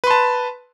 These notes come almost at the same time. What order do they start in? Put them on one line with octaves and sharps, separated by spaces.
B4 C6 A5